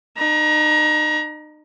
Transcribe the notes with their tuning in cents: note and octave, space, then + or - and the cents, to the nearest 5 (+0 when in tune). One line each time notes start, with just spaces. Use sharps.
D#4 -40 A#5 +30